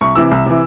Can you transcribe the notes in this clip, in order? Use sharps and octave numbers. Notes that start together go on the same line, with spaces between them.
C2 C#6
C3 E3 E6
C2
C3 E3